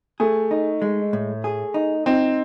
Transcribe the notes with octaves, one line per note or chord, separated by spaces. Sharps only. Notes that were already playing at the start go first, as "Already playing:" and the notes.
A3 G#4
D#4
G#3
A2
G#4
D#4
C4 D#4